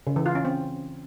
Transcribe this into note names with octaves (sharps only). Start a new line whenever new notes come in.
C#3
E3
F4
C#4
C4